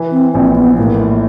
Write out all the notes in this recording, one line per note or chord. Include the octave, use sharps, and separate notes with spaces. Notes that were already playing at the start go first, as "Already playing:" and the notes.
Already playing: E3
C4
A#1 C4
B3
A2 A#3